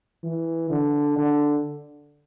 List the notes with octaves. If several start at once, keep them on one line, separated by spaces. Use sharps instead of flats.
E3
D3
D3